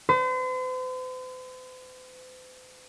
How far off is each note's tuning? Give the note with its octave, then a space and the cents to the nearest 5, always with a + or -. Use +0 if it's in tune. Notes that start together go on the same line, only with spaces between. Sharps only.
C5 -45